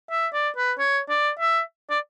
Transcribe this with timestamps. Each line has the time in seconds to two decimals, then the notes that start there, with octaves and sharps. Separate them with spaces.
0.12 E5
0.33 D5
0.57 B4
0.79 C#5
1.10 D5
1.40 E5
1.90 D5